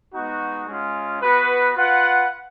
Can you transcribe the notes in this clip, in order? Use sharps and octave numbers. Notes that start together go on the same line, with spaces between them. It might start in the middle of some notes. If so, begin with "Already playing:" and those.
G#3 B3 D#4 F#4
G#3 C#4 F4
B3 F#4 B4
F4 B4 F#5